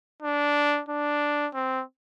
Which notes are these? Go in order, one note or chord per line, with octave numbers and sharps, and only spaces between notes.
D4
D4
C4